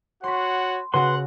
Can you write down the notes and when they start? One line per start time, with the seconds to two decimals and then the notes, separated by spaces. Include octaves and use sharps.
0.24 F#4 C#5 F#5 B5 C6
0.94 C#3 F#4 B4 F#5 C6